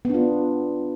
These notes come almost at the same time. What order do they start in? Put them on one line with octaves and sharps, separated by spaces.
B3 D4 F4